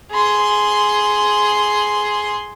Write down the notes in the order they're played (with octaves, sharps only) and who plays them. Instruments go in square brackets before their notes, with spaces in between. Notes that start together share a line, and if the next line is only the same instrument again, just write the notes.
[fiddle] G#4 C6